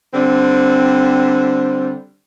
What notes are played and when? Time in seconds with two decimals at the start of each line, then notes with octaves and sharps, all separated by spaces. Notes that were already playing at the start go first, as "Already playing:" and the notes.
0.13 D3 G3 C4